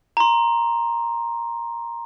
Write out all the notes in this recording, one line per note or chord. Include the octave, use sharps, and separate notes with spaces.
A#5 C6